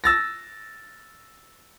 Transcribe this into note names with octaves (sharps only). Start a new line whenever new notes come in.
E6 A6 A#6